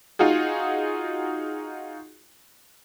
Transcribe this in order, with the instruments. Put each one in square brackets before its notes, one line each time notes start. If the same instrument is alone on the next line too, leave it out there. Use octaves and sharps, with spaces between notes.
[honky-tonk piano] D#4 F4 F#4 G#4